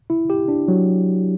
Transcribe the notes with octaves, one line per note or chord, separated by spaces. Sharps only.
E4
G4
D4
F#3